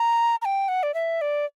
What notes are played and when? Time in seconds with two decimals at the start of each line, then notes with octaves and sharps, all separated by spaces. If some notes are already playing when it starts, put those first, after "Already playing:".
Already playing: A#5
0.42 A#5
0.45 G5
0.68 F#5
0.83 D5
0.94 E5
1.21 D5